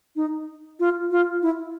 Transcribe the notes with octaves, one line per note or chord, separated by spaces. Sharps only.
D#4
F4
F4
E4